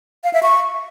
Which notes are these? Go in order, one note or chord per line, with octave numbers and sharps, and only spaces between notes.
F5
E5
C#6